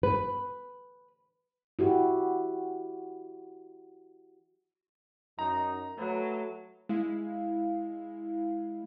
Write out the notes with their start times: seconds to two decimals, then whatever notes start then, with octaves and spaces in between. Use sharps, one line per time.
0.03 B4
1.79 E4 F#4 G4
5.39 F#2 D#4 A#5
5.98 F#3 A3 B4
6.89 G#3 E4 F5